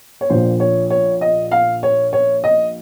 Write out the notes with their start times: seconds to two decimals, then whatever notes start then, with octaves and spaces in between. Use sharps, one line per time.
0.21 C#5
0.30 A#1 A#2 C5
0.60 C#5
0.90 C#5
1.21 D#5
1.51 F5
1.83 C#5
2.13 C#5
2.44 D#5